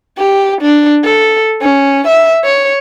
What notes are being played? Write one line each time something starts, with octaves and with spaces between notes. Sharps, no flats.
G4
D4
A4
C#4
E5
C#5